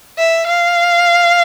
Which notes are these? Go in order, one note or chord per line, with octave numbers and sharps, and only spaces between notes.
E5
F5